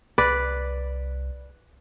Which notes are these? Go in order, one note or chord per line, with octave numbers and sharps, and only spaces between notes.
C2 B4 D5